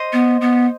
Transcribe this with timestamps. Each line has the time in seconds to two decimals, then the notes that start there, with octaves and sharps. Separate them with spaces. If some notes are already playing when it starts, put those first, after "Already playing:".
Already playing: C5 D#5
0.13 B3
0.41 B3